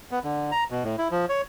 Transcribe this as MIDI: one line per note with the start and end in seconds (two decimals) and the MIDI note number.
0.11 0.19 59
0.24 0.51 50
0.52 0.64 82
0.71 0.83 47
0.84 0.96 45
0.98 1.08 64
1.11 1.26 53
1.29 1.41 73